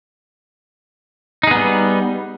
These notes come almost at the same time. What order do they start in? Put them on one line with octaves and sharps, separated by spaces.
D#4 G#4 B3 G3